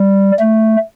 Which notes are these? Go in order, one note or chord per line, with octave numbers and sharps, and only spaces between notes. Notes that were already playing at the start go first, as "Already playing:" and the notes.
Already playing: G3
A3